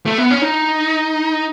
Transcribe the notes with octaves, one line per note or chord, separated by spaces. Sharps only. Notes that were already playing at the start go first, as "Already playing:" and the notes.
A3
B3
C#4
D#4